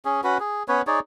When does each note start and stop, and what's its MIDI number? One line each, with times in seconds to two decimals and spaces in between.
0.05 0.21 61
0.05 0.21 68
0.24 0.38 61
0.24 0.38 66
0.24 0.38 71
0.40 0.63 68
0.68 0.82 59
0.68 0.82 61
0.68 0.82 71
0.68 0.82 73
0.87 1.00 63
0.87 1.00 68
0.87 1.00 73
0.87 1.00 74